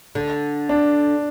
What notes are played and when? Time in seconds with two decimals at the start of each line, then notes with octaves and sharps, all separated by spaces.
0.15 D3
0.69 D4